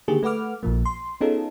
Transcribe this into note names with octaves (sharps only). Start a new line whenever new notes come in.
D3 D#3 A#3 G4 G#4
A3 B4 F#5 D6 F6
A#1 A#2 F3 A#3
C6
B3 C#4 D#4 F4 G#4 A4